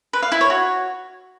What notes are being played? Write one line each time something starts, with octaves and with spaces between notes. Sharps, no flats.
B4
F5
E4
C#5
F#4